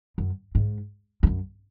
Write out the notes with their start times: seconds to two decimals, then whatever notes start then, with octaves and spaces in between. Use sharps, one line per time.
0.18 F#2
0.55 G#2
1.23 E2
1.27 F#2